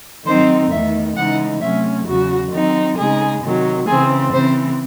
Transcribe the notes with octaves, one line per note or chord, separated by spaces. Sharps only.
D#3 F#3 C4 D#4 C5
E2 D#3 A3 E5
C#3 E3 G#3 D#4 F#5
C3 F#3 A3 C#4 E5
E2 C#3 F#3 F#4
D#3 F#3 C4 D#4
C#3 G#3 D#4 G#4
C3 D#3 F#3
C#3 E3 C4 G#4
C#3 E3 C4 C5